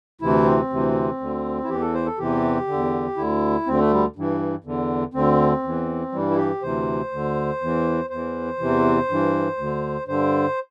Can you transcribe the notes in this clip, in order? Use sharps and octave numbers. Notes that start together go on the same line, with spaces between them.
D2 C3 E3 E4
C4
D2 C3 E3
D2 D3
E4
E2 E3 G4
A4
C5
A4
E2 C3 E3 G4
D3
E2
D2 D3 E4
D2 D3 C4
A3
G3
G2 E3
E2 D3
D2 D3 C4
E2 E3
G2 E3 G3
E4
G4
D2 C3 E3 C5
D2 D3
E2 E3
E2 E3 C5
E2 C3 E3
G2 E3
D2 D3
G2 D3 C5